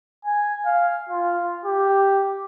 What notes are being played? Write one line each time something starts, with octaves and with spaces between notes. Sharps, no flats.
G#5
F5
F4
G4